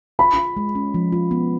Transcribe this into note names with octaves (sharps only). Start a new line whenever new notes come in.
F4 B5
F4
G#3
C#4
F3
F4
B3